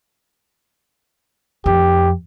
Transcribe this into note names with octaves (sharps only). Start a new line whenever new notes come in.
F2 G4